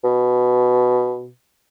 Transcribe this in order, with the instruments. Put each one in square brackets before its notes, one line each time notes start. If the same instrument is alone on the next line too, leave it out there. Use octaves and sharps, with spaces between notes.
[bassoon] B2